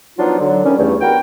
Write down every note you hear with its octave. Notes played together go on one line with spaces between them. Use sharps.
F3 F#3 B3 D4 D#4 F4
D3 F#3
C3 D#3 G3 C#4
E2 G2 A3
B3 F#4 A#4 G5